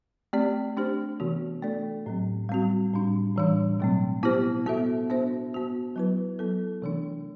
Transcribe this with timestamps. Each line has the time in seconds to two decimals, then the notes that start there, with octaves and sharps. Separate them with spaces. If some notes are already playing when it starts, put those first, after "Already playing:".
0.33 A3 C4 G4 D5
0.77 A3 D4 G4 C5
1.20 C3 E3 B3 F#4
1.62 A3 D4 A4 D5
2.06 A2 F#3 C4
2.49 G3 C4 F#4
2.93 A2 G3 D4
3.36 A2 E3 G3 D4
3.80 B2 F#3 A3 C4
4.23 B3 E4 G4 C5
4.66 B3 F#4 A4 E5
5.10 B3 D4 F#4 C5 E5
5.53 B3 F#4 C5
5.96 F#3 B3 E4 B4
6.39 F#3 B3 E4 A4
6.82 C3 E3 A3 D4